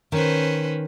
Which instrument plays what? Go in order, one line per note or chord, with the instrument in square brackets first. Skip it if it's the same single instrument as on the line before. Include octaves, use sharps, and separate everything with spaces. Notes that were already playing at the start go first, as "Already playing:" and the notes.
[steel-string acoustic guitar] D#3 [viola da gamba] C#4 B4 C5